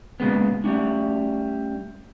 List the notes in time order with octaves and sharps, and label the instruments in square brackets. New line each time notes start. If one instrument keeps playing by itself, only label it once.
[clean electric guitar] A#2 C#3 G#3 B3
G3 A3 C#4 D4